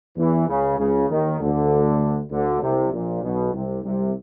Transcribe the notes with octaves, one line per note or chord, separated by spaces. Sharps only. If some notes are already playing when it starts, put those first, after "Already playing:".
E2 E3
C#2 C#3
C#2 C#3
D#2 D#3
D2 D3
D2 D3
C2 C3
A#1 A#2
B1 B2
C2 C3
C2 C3